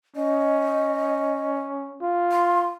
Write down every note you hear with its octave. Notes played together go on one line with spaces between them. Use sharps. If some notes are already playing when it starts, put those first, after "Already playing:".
C#4 D#5
F4
C6